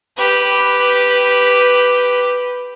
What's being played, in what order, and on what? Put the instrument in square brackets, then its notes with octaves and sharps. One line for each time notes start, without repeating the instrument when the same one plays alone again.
[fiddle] G4 B4